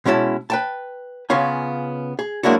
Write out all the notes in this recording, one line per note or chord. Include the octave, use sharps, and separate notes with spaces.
B2 G#3 C#4 E4 A5
B4 G5 A5
C#3 B3 C#4 F4 G#5
G#4
F#3 G#3 A#3 D4 E4 F#4